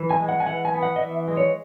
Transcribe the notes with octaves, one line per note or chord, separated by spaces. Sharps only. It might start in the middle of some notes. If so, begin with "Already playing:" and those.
Already playing: E3
G#5
G#3
F#5
G#5
E3 F#5
G#5
B3
F#5
D#5
E3 E5
G#3
C#5